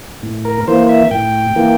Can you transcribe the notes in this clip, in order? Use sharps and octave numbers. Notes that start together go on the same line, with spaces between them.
A2
A#4
E3 A#3 C5
E5
A2 G5
E3 A#3